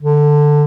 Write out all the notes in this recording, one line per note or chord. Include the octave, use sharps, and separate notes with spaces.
D3